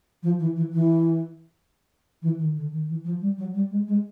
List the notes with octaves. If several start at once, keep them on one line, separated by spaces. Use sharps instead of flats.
F3
E3
E3
E3
E3
D#3
D3
D#3
E3
F3
G3
F#3
G3
G#3
G#3